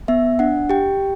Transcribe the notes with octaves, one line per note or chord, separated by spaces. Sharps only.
B3 E5
D4 F#5
G4 G5